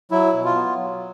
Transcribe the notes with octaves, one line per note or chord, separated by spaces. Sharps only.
F#3 E4
B2
F4
B3
F#3